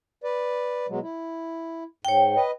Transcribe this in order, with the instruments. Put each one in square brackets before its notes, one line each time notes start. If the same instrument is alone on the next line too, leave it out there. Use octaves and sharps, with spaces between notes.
[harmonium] B4 D5
B2 F#3 G#3
E4
[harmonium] G#2 [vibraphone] C#5 G5
[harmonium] B4 D#5